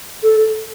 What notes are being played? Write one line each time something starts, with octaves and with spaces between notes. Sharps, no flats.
A4